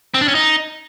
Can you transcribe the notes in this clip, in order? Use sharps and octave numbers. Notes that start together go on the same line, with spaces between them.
C4
D4
C#4
D#4